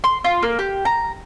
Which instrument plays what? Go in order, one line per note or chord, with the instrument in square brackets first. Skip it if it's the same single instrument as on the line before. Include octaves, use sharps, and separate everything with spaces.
[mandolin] C6
F4
A#3
G4
A#5